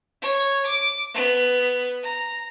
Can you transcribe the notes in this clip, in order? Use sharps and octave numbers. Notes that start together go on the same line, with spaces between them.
C#5
D6
B3
A#5